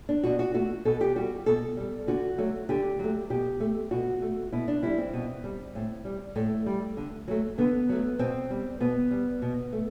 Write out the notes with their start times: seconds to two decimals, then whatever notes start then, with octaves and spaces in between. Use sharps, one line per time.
0.09 D4
0.23 B2 F#4
0.39 F#4
0.54 A3 F#4
0.85 B2 A4
1.01 G4
1.16 G3 F#4
1.46 B2 A4
1.77 G3
2.07 D3 F#4
2.38 F#3 A3
2.69 D3 G4
2.99 F#3 A3
3.30 B2 G4
3.60 A3
3.91 B2 F#4
4.22 A3
4.52 B2 E4
4.68 D4
4.82 G3 E4
4.98 C4
5.13 B2
5.44 G3
5.75 A2
6.05 G3
6.36 A2 A3
6.66 G3
6.97 D3
7.28 F#3 A3
7.58 D3 B3
7.89 F#3 A3
8.19 B2 C4
8.50 G3
8.81 B2 B3
9.11 G3
9.42 B2
9.73 A3